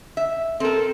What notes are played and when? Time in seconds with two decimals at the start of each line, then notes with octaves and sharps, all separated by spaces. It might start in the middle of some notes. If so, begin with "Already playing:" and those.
0.17 E5
0.60 C4 A4 A#4